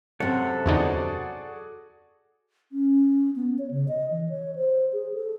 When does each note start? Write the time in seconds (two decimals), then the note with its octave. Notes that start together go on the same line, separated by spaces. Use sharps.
0.20 F#2 C3 A4 C#5 F#5
0.66 E2 D3 D#4 F#4 G#4 D5
2.72 C#4
3.36 B3
3.59 C#5
3.71 C#3
3.88 D#5
4.11 E3
4.29 C#5
4.56 C5
4.93 G#4
5.14 A4